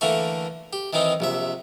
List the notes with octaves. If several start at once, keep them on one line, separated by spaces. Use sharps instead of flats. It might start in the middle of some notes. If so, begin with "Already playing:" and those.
D3 E3 A3 A#3 C#6
G4
D#3 E3 C4 D#4
A#1 C3 E5